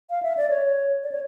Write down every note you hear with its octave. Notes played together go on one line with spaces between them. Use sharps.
F5
E5
D5
C#5
D5
C#5